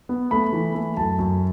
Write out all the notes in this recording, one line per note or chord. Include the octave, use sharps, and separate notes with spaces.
B3
A3 B5
E3
A3
F#2 A5
F#2